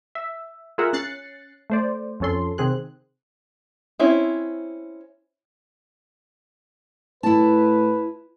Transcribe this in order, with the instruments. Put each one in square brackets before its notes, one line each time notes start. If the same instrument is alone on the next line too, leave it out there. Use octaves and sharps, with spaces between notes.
[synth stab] E5
F4 G#4 A#4 E5 F#5
C#4 F#6 A6 C7 C#7
A3 C5 D5
F2 F3 C#4 A4 C6
C3 D#3 C4 G#4 F#6
[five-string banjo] C4 C#4 E4
[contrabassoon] A2 [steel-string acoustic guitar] E4 A5 [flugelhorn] B4